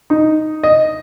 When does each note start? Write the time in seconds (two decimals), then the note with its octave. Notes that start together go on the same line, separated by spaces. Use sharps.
0.10 D#4
0.63 D#5